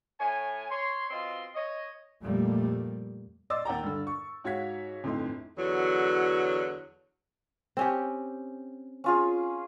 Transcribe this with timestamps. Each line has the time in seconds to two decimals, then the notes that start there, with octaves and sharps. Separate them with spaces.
0.20 A2 C#5 G#5
0.71 C#5 C6
1.10 B2 C4 F4 D#5 C6
1.56 C#5 D#5
2.22 F2 A#2 G3 A3 A#3
3.50 D5 D#5 C6 D6 E6 A6
3.65 D#2 F#5 G5 A#5
3.83 G2 D3
4.07 C#6
4.44 G#2 F#4 C#5 F5 G#6 B6
5.04 G1 F2 A2 D#4 C6
5.58 E2 D3 F#3
7.77 C4 C#4 G4
9.04 C#4 F4 G#4